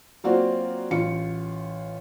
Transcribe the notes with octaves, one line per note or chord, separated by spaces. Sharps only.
F#3 A#3 C4 F4 F#4 D5
A1 F4 C#7